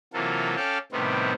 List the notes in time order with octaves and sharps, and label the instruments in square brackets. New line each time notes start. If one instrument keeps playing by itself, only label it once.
[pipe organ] C3 E3 F#3 A#3 F4 A4
C#4 A4 D5 F5 G5 A5
A2 C3 D#3 G3 B3 C4